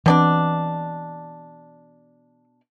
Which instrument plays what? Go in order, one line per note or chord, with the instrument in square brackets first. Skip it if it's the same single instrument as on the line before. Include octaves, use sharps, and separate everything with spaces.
[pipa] B2 D4 D5 [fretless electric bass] E3 C4